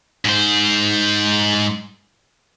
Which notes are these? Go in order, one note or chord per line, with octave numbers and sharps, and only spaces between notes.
G#2 C5